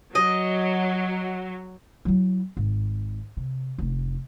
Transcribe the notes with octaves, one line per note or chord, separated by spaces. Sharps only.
F#3 D#5
F#3 E4
G#1
C3
F1 D4